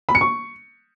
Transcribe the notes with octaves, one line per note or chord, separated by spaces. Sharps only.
B5
C#7
C#6